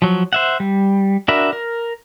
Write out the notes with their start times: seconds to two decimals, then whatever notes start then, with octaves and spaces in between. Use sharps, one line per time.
0.02 F3 F#3
0.33 C5 E5 F#5
0.60 G3
1.28 D4 F#4 A#4 E5 B5
1.53 A#4